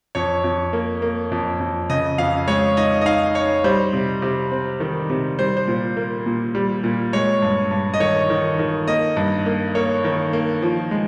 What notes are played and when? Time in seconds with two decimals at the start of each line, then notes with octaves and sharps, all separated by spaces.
0.15 F2 C#5
0.44 F2
0.73 A#3
1.02 A#3
1.32 F2
1.60 F2
1.89 C#3 D#5
2.18 F2 F5
2.48 G#3 C#5
2.77 D#4 D#5
3.01 D#5
3.06 D#4 F5
3.35 D#4 C#5
3.64 G3 C5
3.93 C3
4.22 C3
4.52 C4
4.80 D#3
5.10 C3
5.39 G3 C5
5.57 C5
5.68 A#2
5.97 A#3
6.26 A#2
6.55 G3
6.84 A#2
7.13 G#3 C#5
7.42 G2
7.71 G2
7.94 D#5
8.00 D#3 C#5
8.30 D#3
8.59 D#3
8.88 A#3 D#5
9.16 G2
9.46 A#3
9.75 A#3 C#5
10.05 D#3
10.33 A#3
10.62 F3
10.91 G#3